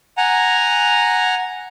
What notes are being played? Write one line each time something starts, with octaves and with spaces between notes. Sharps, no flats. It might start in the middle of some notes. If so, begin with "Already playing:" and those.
F#5 G#5 A#5